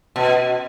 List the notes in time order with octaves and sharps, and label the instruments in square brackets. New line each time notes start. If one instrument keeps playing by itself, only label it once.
[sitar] B2